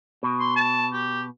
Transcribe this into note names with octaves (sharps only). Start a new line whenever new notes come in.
B2
C6
A5
G4